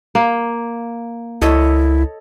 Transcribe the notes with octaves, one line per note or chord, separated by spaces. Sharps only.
A#3
C#2 E4 A4 C#5 D#5